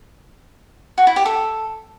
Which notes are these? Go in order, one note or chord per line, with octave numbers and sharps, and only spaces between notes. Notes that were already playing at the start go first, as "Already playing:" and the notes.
F#4
E4
G4
A4